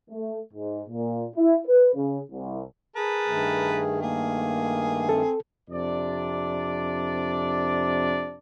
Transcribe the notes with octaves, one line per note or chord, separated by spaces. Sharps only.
A3
G#2
A#2
E4
B4
C#3
C2
G#4 A#4 B4 A5
G2 D#3 A3
A#3 G#4
C4 A4
F2 C3 D4 D5